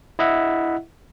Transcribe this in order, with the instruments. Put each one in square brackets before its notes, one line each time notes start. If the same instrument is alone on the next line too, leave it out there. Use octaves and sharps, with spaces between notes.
[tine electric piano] E4 D#5 E5 F#5